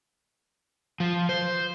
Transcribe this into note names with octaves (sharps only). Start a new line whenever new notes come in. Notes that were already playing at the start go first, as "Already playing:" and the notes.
F3
C5